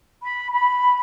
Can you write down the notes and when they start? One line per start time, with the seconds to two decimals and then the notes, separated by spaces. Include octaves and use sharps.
0.23 B5
0.53 B5